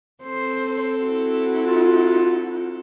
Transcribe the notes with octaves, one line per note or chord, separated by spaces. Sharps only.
C4 A4 C5
E4 F#4
F4